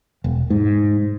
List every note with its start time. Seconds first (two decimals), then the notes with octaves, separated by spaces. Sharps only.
0.24 E1
0.50 G#2